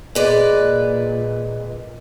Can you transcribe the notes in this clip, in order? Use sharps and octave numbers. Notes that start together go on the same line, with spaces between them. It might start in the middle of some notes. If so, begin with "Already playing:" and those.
A#2 G#3 B4 D5